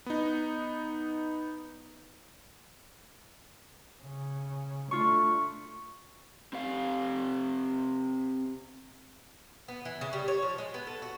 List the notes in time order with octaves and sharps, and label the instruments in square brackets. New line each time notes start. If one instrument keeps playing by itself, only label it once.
[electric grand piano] B3 D#4
[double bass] C#3
[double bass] A3 D4 [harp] F4 C#6
[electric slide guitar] C4 G4 F5
[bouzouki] B3
E3
C#3
G3
C#5
F3
G#3
B3
A4
F#4